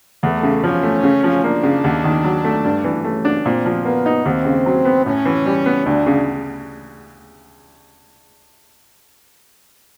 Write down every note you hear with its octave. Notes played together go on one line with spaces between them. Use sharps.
E2 A3
C#3
F3 C#4
A3
C#3
F3
A#3 D4
C#3
D#2
D#3
F#3
A3
G2
E3
A3 C#4
D4
A#2 C4
F3
A#3 B3
D#4
D#2 C4
C#3
F#3
B3
A2 C#4
E3
G3
B3
D2 D4
C#3